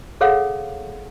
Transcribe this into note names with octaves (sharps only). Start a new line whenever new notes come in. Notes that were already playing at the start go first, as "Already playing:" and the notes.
G#4 A4 C#5 F5 F#5